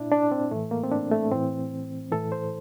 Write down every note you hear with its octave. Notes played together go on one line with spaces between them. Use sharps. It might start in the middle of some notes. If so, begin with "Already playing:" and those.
Already playing: A#2 D4 E4
D4
C4
A2 E3 A3
A#3
C4
D4
A3
A2 E3 C4
A2 E3 A4
C5